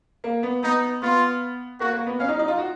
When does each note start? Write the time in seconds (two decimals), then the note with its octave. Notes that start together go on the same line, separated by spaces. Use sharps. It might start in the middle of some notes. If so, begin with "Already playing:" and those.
0.24 A#3
0.43 B3
0.63 B3 D#4
1.02 B3 F4
1.80 A#3 F#4
1.93 A#3
2.06 B3
2.19 C#4 F5
2.29 D#4
2.39 D#4
2.48 F4
2.58 F#4